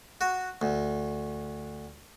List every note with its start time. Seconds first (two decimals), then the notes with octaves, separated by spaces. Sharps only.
0.21 F#4
0.62 D2